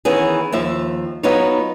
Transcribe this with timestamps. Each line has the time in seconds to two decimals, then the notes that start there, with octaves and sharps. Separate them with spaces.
0.05 D#3 E3 B3 C#4 G#4
0.52 D#2 F3 E5
1.23 F#3 B3 D#4 F4 B4 C#5